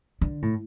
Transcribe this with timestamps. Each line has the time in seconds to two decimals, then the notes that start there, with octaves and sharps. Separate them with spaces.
0.21 D3
0.42 A2